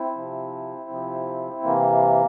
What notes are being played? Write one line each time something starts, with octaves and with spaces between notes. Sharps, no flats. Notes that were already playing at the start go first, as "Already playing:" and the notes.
Already playing: C4 E4
C3 F3
C3 F3
C3 E3 A#3